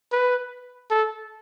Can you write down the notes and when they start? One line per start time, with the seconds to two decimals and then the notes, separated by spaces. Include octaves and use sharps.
0.12 B4
0.91 A4